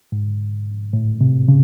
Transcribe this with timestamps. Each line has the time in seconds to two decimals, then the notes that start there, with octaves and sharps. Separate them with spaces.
0.12 G#2
0.93 A2
1.21 C3
1.48 C#3